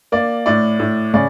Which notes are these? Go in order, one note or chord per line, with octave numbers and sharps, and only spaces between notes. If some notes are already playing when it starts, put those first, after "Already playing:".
A#3 D5
A2 D5
A2
C#3 D5